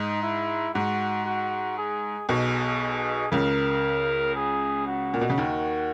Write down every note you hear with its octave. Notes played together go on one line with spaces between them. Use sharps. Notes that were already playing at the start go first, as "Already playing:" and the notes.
Already playing: G#2 D#4
E4
G#2 F#4
F#4
G#4
B1 B2 G#4
C#2 C#3 A#4
G#4
F#4
A#2
B2
C#3
D#2 D#3